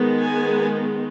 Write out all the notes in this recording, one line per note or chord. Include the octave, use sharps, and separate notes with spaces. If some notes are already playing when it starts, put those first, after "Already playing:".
Already playing: D#3 G#3 B3
G#5